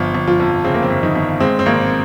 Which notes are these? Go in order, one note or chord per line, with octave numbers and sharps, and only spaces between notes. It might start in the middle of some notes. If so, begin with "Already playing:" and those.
Already playing: G1 F3 F4
G1
F3 F4
F2
C#3 C4
A#3
C4
G1
D#3 D#4
G1
G#3 C4
C4
G#1 A#3